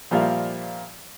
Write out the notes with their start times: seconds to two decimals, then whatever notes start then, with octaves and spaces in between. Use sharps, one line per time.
0.11 A#2 F3 G3 A#3 E5 F5